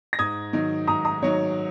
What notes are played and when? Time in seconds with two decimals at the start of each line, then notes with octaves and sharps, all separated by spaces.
0.13 A#6
0.19 G#2 D#6 G#6
0.53 D#3 F#3 D#4
0.87 G#2 A#5 D#6
1.05 A#5 D#6
1.22 D#3 F#3 D#4 C#5